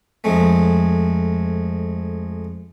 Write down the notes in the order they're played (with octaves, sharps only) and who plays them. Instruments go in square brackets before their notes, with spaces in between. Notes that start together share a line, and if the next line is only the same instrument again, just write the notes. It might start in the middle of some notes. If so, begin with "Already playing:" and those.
[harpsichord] F2 G#3 A3